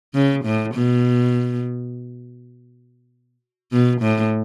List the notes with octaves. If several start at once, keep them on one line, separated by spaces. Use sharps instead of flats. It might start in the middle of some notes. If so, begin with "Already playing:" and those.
C#3
A2
B2
B2
A2